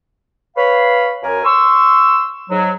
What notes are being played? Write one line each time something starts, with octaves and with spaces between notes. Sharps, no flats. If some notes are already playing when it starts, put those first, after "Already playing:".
B4 C#5 F5 B5
F#2 A#4 G#5
C6 C#6 E6
G#2 F#3